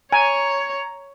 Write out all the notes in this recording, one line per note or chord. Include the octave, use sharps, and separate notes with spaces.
C#5 G#5 A#5